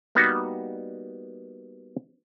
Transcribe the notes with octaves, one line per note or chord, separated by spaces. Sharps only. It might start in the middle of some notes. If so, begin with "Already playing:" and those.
G3 A#3 B3 D#4 F#4